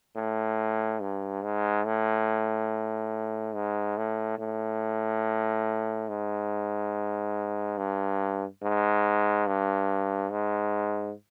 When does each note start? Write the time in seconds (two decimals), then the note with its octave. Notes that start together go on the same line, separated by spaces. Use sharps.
0.16 A2
1.01 G2
1.44 G#2
1.86 A2
3.55 G#2
3.98 A2
4.39 A2
6.09 G#2
7.78 G2
8.62 G#2
9.47 G2
10.31 G#2